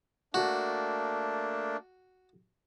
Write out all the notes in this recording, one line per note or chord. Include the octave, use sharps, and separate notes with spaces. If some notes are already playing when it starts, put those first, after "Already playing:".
A3 A#3 D4 F#4